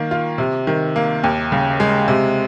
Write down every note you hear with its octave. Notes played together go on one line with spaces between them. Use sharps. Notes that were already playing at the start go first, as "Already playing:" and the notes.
Already playing: D#3 A#3
F4
C3
D#3
A#3
D#2
C#3
G#3
C3